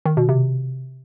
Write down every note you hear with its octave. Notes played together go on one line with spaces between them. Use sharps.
D#3
B2
C3